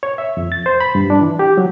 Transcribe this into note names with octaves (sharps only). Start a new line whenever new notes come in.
C#5
E5
F2
A6
C5
B5
G2
D4
E3
G4
F#3